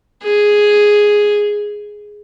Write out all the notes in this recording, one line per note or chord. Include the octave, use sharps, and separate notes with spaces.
G#4